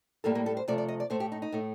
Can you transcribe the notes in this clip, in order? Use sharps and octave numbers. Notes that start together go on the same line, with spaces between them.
A2 G3 A#3 A4
A#3
A4
C5
C3 F3 A3 D5
D5
D#5
D5
A2 A3 C5
G4
D#4
D#4
A2 A3